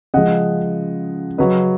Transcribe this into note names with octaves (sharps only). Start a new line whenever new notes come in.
C#3 F3 G#3 D#5 F#5
C#3 F#3 B4 D#5